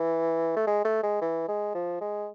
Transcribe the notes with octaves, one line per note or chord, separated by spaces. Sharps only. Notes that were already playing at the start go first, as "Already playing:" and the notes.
Already playing: E3
A3
G#3
A3
G#3
E3
G#3
F3
G#3